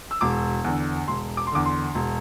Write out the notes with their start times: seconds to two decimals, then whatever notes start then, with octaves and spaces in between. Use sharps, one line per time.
0.11 E6
0.21 E1 D6
0.64 E2 D3
1.08 E1 C6
1.37 D6
1.47 C6
1.52 E2 D3 D6
1.66 C6
1.95 E1